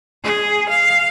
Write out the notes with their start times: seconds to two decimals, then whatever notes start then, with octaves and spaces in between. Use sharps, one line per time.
0.24 G#4
0.69 F5